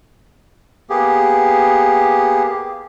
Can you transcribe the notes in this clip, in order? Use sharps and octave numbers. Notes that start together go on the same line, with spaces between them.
A#3 B3 G4 G#4